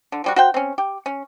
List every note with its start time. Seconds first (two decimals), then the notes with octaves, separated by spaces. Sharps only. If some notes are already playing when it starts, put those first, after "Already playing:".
0.12 D3
0.24 F3 G3 F#4
0.36 F#4 C5 G5
0.54 C4 C#4
0.78 G4
1.06 C#4